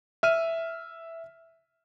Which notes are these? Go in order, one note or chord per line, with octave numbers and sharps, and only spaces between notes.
E5 F6 D#7